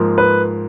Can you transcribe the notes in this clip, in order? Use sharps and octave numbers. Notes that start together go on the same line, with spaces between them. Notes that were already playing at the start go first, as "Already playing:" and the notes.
Already playing: G#2 F3 A#3
B4